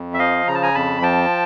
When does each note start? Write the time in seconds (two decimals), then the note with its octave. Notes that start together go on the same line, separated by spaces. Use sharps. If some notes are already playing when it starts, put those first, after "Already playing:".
Already playing: F2
0.14 E5
0.19 F3 D#5 F5
0.48 C#3 A#5
0.55 A5
0.62 G#5 A#5
0.75 F2 A5 B5
1.02 F3 G5 A5